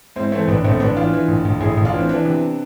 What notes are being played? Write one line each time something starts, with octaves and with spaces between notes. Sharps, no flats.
G#2 C4 E4
E3 A3 C4
A1 B3 D4
A1 A3 C4
A1 B3 D4
E3 D4 F4
E3
A1
A1
A1 E4 G#4
A1
D4 F4
E3
C4
E3 B3 D4
C3